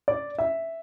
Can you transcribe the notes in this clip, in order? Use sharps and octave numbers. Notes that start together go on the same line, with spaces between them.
D5
E5